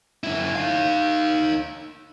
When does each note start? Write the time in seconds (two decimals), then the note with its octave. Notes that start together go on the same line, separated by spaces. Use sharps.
0.24 F#2 E4
0.55 D#4 F5